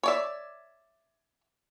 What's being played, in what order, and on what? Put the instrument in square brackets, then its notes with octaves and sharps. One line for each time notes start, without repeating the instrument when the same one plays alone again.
[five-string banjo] C#5 D5 E5